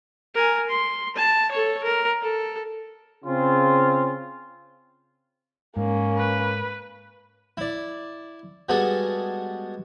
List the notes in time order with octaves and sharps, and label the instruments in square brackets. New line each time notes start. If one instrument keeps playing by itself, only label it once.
[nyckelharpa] A#4 G#5
C6
A5
A4 C#5
A#4
A4
[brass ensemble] C#3 C4 F4
[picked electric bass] G#2 [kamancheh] A#3 C#4
[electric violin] B4
[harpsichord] E4 D5
G3 G#3 B3 F#4 G#4 A4